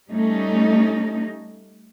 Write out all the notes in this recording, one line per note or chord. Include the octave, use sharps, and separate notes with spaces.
G3 A3 C#4 D#4